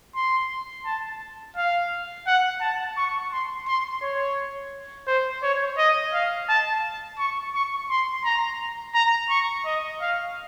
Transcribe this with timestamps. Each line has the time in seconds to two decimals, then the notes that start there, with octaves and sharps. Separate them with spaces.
0.16 C6
0.86 A5
1.57 F5
2.27 F#5
2.61 A5
2.97 C#6
3.32 C6
3.68 C6
4.02 C#5
5.07 C5
5.43 C#5
5.78 D#5
6.14 F5
6.49 A5
7.19 C#6
7.55 C#6
7.90 C6
8.25 A#5
8.95 A#5
9.30 C#6
9.66 D#5
10.01 F5